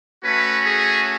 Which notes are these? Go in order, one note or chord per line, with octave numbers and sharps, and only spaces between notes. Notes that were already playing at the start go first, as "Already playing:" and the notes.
A3 C#4 F#4 B4
G#4